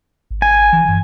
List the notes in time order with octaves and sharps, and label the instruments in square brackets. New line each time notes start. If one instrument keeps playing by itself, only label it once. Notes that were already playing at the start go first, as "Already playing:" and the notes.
[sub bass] G#1
[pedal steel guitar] G#5
[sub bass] E3
G2